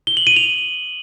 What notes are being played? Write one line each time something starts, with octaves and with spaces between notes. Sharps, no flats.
G7
F#7
D#7
F7